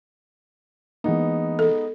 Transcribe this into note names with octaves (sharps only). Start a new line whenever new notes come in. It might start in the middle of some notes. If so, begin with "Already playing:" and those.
E3 G#3 A#3 B3 D#4
A4